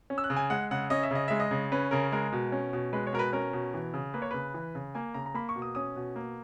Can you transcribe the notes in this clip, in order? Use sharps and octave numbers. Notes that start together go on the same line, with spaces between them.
C#4
E6
F#6
C#3
G#5
G#3 F#5
C#3 F#5
C#4 D#5
E5
C#3 D#5
G#3 E5
D#5
C#3
C#4 B4
C#3 A#4
G#3 A#4
B2
C#4
B2
G#3 B4
C#5
B2 A#4
B4
C#4 A#4
B2
E3
C#3
A#3 B4
C#5
C#3 B4
E3
C#3
A#3 G#5
C#3 A#5
A#5
A#3 B5
C#6
B2
D#6
C#4 D#6
B2
A#3